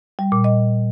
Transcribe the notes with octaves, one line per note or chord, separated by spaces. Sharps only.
G3
A#2
D#5